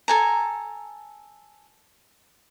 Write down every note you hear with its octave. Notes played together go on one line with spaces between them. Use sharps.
A4 G#5 A#5